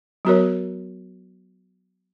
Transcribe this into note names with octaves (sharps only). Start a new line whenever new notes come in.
F#3 B3 F#4 A#4 C#5